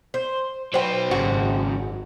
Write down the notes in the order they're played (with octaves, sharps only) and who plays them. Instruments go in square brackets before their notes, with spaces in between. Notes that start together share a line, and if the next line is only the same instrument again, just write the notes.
[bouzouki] C5
[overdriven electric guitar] F#3 B4 [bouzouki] C5 G5
[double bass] G#1 [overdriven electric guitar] F#2 C#3 [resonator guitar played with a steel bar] F#4